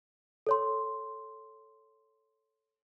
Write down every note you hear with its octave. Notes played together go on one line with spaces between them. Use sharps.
A4 C#5 C6